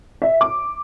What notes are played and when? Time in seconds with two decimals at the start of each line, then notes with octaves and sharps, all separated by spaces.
0.22 E5
0.41 D6